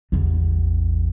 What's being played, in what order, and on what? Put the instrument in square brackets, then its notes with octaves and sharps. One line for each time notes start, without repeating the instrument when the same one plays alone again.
[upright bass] A1 E2